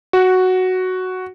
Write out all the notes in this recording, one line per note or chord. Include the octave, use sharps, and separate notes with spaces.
F#4